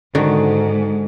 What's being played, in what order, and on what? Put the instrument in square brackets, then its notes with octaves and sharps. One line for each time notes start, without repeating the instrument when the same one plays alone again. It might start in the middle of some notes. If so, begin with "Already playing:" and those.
[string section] G#2 [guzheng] D3 D#3 F#4